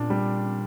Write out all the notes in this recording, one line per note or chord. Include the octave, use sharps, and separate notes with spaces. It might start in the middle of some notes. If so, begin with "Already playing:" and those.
Already playing: A#2 D4
G3